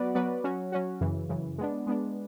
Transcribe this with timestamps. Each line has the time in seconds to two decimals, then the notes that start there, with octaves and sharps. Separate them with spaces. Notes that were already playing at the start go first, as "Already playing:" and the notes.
Already playing: F#3 B3 F#4 B4 D5
0.15 F#3 B3 F#4 B4 D5
0.44 F#3 C#4 F#4
0.72 F#3 C#4 F#4
1.01 F#2 C#3 E3
1.29 F#2 C#3 E3
1.58 G#3 B3 D4
1.87 G#3 B3 D4